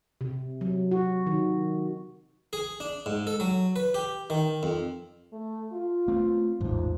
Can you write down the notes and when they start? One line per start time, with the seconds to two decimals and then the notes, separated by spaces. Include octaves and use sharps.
0.21 C3
0.61 F#3
0.91 F#4
1.26 D#3
2.53 G#4
2.80 D4
3.06 G#2
3.27 A4
3.40 F#3
3.76 B4
3.94 G4
4.30 D#3
4.63 F2
5.32 A3
5.73 F4
6.08 A3 B3 C4
6.60 A1 E2 G#2 F3